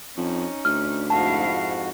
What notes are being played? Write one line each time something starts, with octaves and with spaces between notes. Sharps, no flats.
F2 C#4 D#4
D2 F6
F2 G#2 E4 F#4 F5 A5